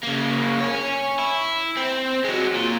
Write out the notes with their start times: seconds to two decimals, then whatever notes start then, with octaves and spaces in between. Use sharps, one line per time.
0.03 C#3 A#3
0.60 C#5 G#5
1.19 E4
1.77 C4
2.24 F#3 G#3
2.54 A#2